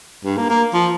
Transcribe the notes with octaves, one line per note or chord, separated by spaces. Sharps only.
G2
A#3
A#3
F3